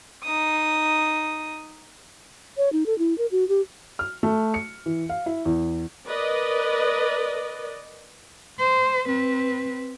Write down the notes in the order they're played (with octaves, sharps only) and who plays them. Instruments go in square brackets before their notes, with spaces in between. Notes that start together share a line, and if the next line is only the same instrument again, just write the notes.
[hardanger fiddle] D#4 D#6
[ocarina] C#5
D#4
A4
E4
A#4
F#4
G4
[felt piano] F6
A3
C#7
E3
F5
E4
E2
[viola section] A#4 B4 D5 D#5
[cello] C5
C4 B4